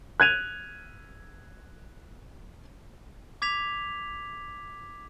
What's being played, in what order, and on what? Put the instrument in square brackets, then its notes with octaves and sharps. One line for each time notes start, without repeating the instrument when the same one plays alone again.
[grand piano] F#6 G#6 D#7 F7
[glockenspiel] D6 G#6 B6 F7